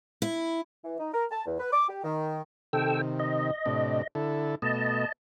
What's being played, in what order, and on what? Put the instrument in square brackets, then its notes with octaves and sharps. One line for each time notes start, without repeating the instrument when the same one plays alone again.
[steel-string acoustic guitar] E4
[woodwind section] E3
D#4
A#4
A5
E2
B4
D6
G4
D#3
[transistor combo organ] C3 D#3 [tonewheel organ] A4 G5 E6
[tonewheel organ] D#5
[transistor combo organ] A2 C3 D4
D3 E4 A4
[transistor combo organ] B2 A3 [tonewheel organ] D#5 A5